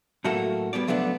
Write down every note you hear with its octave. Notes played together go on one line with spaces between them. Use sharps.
A2 F#3 A3 A#3 F#4 A4
G3 B3 C#5 D5
F3 F#3 A3 B3 D4